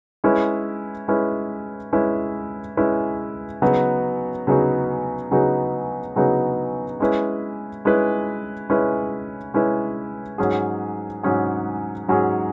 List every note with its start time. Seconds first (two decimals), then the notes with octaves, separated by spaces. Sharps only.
0.24 G#3 C#4 E4 B4
1.08 G#3 C#4 E4 B4
1.93 G#3 C#4 E4 B4
2.77 G#3 C#4 E4 B4
3.62 C#3 F#3 B3 D#4 F#4
4.47 C#3 F#3 B3 D#4 F#4
5.31 C#3 F#3 B3 D#4 F#4
6.16 C#3 F#3 B3 D#4 F#4
7.00 G#3 C#4 E4 B4
7.85 G#3 C#4 E4 B4
8.70 G#3 C#4 E4 B4
9.54 G#3 C#4 E4 B4
10.38 G#2 F#3 C#4 G#4
11.23 G#2 F#3 C#4 G#4
12.08 G#2 F#3 C#4 G#4